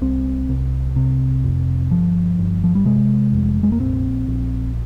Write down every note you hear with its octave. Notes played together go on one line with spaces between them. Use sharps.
C2 C4
C2
C3
F1
G1 F3
G1
F3
G3
C3 G#3
F1
G#3
A#3
A#1 C4
A#1